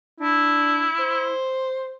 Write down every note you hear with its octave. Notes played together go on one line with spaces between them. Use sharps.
D4 E4
C5